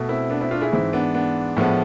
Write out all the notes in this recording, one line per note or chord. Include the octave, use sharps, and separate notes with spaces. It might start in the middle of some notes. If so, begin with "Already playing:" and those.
Already playing: B2 A3
C4 E4
B3 D4
C4 E4
D4 F4
E4 G#4
G#2 E3 G#3 C4 E4
B3 D4
B3 D4
A2 F3 G#3 B3